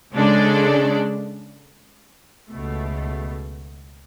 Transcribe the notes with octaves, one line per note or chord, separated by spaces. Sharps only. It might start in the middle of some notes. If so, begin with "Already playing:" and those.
C#3 G#3 D4 A4 D5
C#2 B2 A3